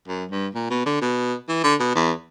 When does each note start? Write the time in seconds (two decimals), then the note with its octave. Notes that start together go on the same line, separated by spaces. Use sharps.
0.08 F#2
0.31 G2
0.55 A#2
0.70 B2
0.86 D3
1.01 B2
1.49 E3
1.64 D3
1.80 B2
1.96 E2